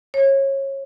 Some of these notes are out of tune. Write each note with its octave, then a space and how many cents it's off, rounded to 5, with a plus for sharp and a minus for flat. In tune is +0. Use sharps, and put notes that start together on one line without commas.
C#5 -25